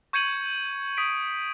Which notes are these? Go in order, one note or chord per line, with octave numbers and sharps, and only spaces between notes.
C#6 G6 G#6 C#7 D#7 F#7
D#6 B6 D7